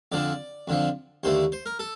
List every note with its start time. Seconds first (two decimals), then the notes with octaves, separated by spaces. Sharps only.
0.12 F2 D3 F3 D5
0.68 F2 D3 F3
1.23 D#2 D3 A3 C5
1.52 C5
1.66 A#4
1.79 A4